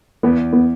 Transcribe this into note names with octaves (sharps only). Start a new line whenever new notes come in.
E2 B3
B3